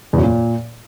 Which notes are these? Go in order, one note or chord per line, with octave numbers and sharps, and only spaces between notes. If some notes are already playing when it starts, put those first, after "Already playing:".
E2
F#2
A#2